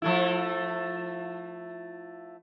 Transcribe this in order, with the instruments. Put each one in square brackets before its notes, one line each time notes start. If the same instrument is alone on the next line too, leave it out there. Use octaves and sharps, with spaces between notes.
[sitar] F3 A3 E4